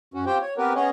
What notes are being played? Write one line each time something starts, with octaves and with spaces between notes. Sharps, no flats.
F#2 C#4 F#4
C4 F4 G4 C5 G5
C#5
B3 C4 G4 A#4 B4
B3 C#4 G#4 C#5 D#5